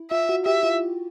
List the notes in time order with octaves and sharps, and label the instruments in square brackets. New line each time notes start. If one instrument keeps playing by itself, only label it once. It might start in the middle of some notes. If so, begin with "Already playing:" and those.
Already playing: [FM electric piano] E4
[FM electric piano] F4 [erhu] E5
[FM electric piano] F#4
[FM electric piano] G4 [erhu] E5
[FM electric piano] F4